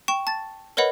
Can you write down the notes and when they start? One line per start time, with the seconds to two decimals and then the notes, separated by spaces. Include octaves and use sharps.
0.08 G5 C#6 E7
0.27 A5 A6
0.77 A#4 B4 C#5 D#5 F#5 B5